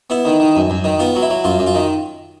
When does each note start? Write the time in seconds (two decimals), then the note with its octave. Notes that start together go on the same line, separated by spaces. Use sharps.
0.10 B3 E4
0.25 D#3
0.40 D#3
0.56 F#2
0.70 F#2
0.84 D#3
0.99 B3 F4
1.15 F#3
1.22 E4
1.30 F#3
1.44 F#2 F4
1.59 F#2
1.67 F4
1.74 D#3